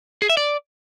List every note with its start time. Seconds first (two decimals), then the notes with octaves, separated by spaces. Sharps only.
0.22 G#4
0.29 E5
0.37 D5